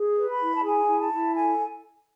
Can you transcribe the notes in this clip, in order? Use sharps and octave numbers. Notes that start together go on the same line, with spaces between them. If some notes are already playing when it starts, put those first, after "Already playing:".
Already playing: G#4
B4
B5
E4
A5
G#4 G#5
E4
A5
E4
A4 G#5